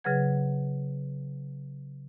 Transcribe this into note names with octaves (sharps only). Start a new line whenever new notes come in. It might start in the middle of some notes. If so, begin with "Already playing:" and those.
C#3 F#3 G#4 B4 F#5 G#6